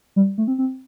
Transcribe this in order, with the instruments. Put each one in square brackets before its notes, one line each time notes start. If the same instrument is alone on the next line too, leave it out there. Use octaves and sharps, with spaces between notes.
[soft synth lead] G3
A3
C4
C4